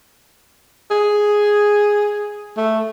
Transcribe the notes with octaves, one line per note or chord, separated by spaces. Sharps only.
G#4
A3